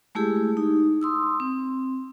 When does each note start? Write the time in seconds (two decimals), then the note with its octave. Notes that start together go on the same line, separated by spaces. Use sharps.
0.15 G#3 A3 E4 G4 G#4
0.57 D#4
1.01 C6 D#6 E6
1.40 C4